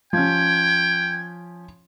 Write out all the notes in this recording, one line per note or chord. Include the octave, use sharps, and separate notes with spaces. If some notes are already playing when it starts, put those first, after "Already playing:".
F3 C#4 G5 G#6